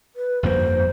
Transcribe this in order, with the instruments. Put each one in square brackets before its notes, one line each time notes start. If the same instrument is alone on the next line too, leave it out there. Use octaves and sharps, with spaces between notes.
[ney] B4
[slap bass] G1 F2 A#3 [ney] C5